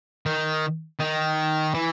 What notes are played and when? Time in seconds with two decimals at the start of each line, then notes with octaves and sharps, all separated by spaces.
0.26 D#3
1.00 D#3
1.74 E3